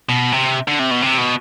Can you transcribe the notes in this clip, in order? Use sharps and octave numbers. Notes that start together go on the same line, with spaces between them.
B2
C3
D3
C3
B2
C3
B2